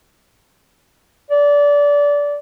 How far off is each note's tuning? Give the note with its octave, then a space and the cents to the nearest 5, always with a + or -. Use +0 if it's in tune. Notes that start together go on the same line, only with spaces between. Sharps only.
D5 -20